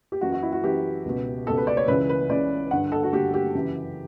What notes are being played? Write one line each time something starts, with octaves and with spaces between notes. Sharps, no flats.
G4
F#2 E3 F#4
F#4
E4
F#4
F#2 E3 G4
C#2 B2
C#2 B2 A4
B4
D5
C#5
C#2 C#3 E3 B4
B4
C#2 C#3 E3 D5
G2 D3 F#5
A4
F#4
G2 D3 G4
G4
F#2 C#3 E3